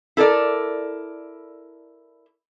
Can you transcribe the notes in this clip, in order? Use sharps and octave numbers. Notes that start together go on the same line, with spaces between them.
E4 A4 A#4 D5